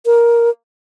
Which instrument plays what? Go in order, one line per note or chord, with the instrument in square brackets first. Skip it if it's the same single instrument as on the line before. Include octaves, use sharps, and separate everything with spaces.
[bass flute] A#4